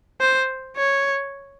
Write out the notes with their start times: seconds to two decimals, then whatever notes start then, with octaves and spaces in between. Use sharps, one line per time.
0.21 C5
0.77 C#5